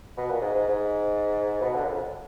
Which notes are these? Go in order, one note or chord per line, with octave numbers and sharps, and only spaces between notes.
B2
A#2
G#2
G#2
G#2
B2
D3
F#2
F2